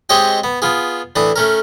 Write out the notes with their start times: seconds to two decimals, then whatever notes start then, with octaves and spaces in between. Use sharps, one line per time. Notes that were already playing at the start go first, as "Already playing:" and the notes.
0.09 G#3 C4 G4 C#5 D#5 G5
0.44 B3
0.62 B3 F4 G#4
1.16 A2 E3 D4 D#6
1.36 A3 C#4 A#4